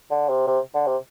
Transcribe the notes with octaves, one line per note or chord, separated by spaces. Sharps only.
D3
C3
C3
D3
C3